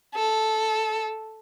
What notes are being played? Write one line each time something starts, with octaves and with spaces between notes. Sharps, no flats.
A4